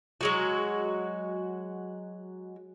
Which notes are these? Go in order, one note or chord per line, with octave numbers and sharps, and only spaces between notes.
F#3 G#3 F#4